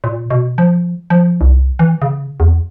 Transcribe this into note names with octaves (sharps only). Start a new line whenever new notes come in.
A#2
B2
F3
F3
C2
E3
C#3
E2